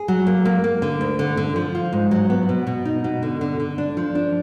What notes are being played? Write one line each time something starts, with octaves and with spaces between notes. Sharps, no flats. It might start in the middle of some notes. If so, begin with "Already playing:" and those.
Already playing: G#4
F#3
A#3
A#3
A#3
D3
D2
D3
D3
F3
F4
G#2
F#3
B3
B2
B2
D#4
B2
D3
D3
D3
D4
F3
D4